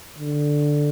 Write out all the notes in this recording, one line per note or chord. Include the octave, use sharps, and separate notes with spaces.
D3